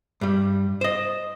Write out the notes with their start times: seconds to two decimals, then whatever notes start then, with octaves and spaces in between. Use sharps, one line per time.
0.21 G2 G3
0.81 C5 D#5